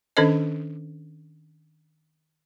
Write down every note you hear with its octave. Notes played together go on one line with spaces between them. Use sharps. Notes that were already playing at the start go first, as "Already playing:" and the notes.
D#3 C#4 D4 A4 C5 D#5